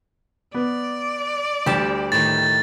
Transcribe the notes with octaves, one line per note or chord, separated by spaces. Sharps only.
B3 D5
D2 G3 G4 A5
A2 D#3 A6